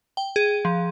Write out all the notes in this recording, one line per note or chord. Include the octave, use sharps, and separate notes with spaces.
G5
G#4
F3